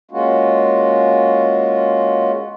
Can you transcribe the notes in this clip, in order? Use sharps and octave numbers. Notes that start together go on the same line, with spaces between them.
G#3 A#3 C#4 F4 F#4